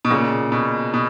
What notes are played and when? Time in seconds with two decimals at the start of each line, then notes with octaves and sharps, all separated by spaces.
0.05 B2
0.10 A#2 C#3
0.52 B2
0.94 B2